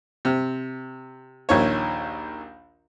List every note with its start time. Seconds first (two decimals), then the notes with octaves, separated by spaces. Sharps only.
0.25 C3
1.49 A#1 D#2 C#5